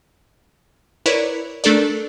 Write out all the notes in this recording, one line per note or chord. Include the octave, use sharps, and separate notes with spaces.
E4 A#4 B4 C#5 D5
A3 D4 A4 A#4 D5